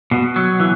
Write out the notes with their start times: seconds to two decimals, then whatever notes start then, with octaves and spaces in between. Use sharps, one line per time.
0.11 B2
0.36 F#3
0.60 E3